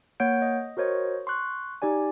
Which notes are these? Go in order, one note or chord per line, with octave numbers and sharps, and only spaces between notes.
A#3 C#5 F#5 G6 D7
D#5
F#4 A#4 C5 C#5 D#5 C#6
C6 C#6 F#6
D#4 G4 D5 G#5